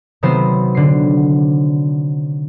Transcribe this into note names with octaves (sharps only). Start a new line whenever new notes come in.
C3 D#3 F#3 B3 C5
D3 C7